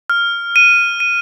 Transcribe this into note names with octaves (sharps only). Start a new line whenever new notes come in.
F6
D#7
D#7